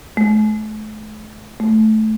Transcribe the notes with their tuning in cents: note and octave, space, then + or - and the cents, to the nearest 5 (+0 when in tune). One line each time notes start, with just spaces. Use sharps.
A3 -40
A3 -15